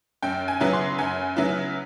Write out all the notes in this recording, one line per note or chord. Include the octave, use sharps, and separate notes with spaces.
F#2 G5
G#5
C#3 F#3 B3 E4
C6
F#2 G#5
C#3 F#3 B3 E4